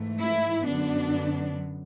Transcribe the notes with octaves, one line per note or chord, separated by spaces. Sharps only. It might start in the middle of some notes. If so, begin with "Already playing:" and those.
Already playing: G#2 E3 A3
E4
F#2 D3 F#3 B3 D4